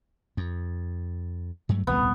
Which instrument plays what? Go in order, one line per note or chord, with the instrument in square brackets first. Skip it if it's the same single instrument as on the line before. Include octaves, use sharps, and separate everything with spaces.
[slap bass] F2
G2 F#3 A3
[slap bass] D#1 C2 A2 [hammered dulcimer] B3